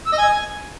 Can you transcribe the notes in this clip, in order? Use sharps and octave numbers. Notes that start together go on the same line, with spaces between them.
E6
D#5
G#5